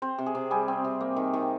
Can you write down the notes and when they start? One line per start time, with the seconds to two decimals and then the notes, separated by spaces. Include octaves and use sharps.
0.02 C4 C5
0.18 C3
0.26 G#4
0.35 C3
0.51 G3 G#4
0.68 C4
0.84 C3
1.01 A#3
1.17 D#3
1.33 D#3